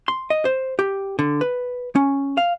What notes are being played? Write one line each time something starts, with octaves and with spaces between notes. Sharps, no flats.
C6
D#5
C5
G4
D3
B4
C#4
F5